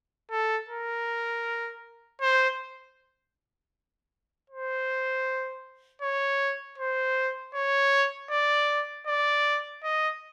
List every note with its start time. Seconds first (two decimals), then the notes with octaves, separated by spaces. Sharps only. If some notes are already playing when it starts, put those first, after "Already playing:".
0.31 A4
0.69 A#4
2.21 C5
4.50 C5
6.02 C#5
6.78 C5
7.54 C#5
8.31 D5
9.07 D5
9.83 D#5